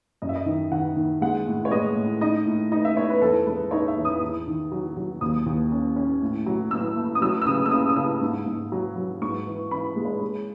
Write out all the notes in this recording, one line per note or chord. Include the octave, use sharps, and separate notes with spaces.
F#2 D#5
E5
D#5
D#3
D#3 F#5
D#3
G#3 F#5
A2
C#5
G#3 D#5
A2
D#4 D#5
A2
D#4 D#5
E5
B3 C#5
B4
E2 A4
G#3 B4
D#4 C#5
E5
E2
D#6
E2
D#3
F#3
F#3
D#2 D#6
D#2
C#4
C#4
A2
F#3
A2 E6
A3
D#6
F#3 E6
E6
C#3 D#6
E6
C#4 D#6
D#6
C#3 E6
G#2
G#2
F#3
F#3
G#2 C#6
E3
E3 B5
G#3
C#5
G#3